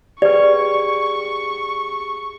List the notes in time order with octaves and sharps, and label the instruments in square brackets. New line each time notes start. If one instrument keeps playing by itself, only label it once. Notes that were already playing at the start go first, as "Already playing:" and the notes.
[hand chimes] G4 G#4 [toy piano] B4 D5 [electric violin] C#6